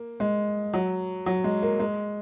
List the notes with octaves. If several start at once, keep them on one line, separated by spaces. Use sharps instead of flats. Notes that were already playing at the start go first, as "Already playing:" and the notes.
Already playing: A#3
G#3
F#3
F#3
G#3
A#3
G#3